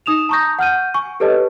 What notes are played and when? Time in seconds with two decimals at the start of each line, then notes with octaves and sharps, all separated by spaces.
0.06 D#4 D#6 E7 F7
0.29 A5 A#5 C#6 D#6 G6 A#6
0.59 F#5 F6 G6 D#7
0.94 G#5 C#6
1.20 G4 A4 B4 C#5 D#5 A5